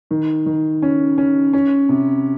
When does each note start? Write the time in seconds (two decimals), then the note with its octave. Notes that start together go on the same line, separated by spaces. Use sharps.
0.11 D#3
0.46 D#3
0.82 C#4
1.18 C#4
1.53 C#4
1.89 C3